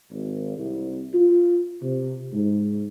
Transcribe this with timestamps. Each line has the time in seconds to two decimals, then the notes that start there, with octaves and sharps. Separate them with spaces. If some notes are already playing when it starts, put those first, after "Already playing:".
0.11 G#1
0.58 C2
1.14 F4
1.83 C3
2.33 G#2